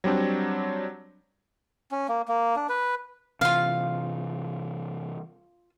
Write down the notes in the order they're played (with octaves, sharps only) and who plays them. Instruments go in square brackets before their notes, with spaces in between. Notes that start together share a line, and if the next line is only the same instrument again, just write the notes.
[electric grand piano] F#3 G3 C4 D4
[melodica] C#4
A#3
A#3
D4
B4
[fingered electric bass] C3 E3 [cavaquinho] F4 F5